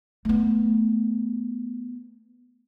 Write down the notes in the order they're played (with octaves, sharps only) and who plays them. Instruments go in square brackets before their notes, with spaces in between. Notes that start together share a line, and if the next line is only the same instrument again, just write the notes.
[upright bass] A3 B3